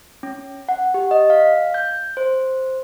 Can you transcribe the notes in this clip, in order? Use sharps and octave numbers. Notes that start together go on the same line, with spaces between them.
C#4
F#5
G4
D#5
F5
G6
C5